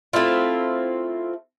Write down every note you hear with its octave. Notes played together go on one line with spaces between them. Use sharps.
A3 C4 E4 F4